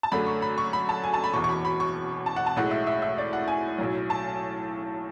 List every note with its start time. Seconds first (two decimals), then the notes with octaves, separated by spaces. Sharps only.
0.03 A5
0.12 F#2 D3 A3 B5
0.26 C#6
0.42 B5
0.58 C#6
0.73 B5
0.89 A5
1.04 G#5
1.14 A5
1.24 B5
1.34 E1 E2 B2 C#6
1.44 C#6
1.49 B5
1.65 B5
1.80 C#6
2.26 A5
2.36 F#5
2.46 A5
2.56 B1 A2 G#3 F#5
2.71 E5
2.87 E5
3.02 E5
3.18 D5
3.33 F#5
3.48 G#5
3.79 B1 A2 F#3
4.10 A5